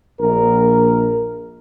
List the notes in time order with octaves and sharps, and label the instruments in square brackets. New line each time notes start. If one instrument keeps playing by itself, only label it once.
[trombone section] A#1 A#4